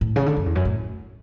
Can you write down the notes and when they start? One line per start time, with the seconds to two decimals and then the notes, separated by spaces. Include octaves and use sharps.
0.01 A2
0.16 C#3
0.26 D3
0.36 F#2
0.46 E2
0.55 F#2
0.65 A2